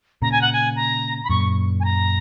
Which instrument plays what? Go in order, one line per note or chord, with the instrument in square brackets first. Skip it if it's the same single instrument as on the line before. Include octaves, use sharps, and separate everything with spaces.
[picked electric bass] A#2 C#3 [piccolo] A#5
[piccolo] G#5
F#5
G#5
A#5
B5
[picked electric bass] F#2 A#2 [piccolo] C#6
[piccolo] G#5
A#5